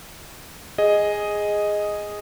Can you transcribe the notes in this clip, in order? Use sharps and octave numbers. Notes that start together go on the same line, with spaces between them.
G#4 D#5